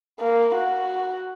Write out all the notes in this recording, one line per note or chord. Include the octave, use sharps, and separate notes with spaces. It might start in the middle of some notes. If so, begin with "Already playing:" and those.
A#3
F#4